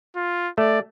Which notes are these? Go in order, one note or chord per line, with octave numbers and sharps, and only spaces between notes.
F4
A3 D5